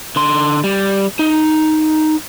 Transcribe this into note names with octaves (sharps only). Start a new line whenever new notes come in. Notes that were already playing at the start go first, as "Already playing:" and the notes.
D3 C6
G3
D#4